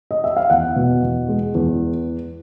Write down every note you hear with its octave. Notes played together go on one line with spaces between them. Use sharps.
D#5
E5
F5
E2 F#5
B2
E2
G#3
E2